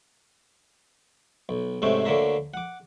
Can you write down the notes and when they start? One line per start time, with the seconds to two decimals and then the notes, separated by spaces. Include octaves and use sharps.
1.49 B1
1.82 G#2 C3 A3 C4 C#4
2.05 D2 D3 A#3 C#5 E5 A#5
2.54 F#5 D6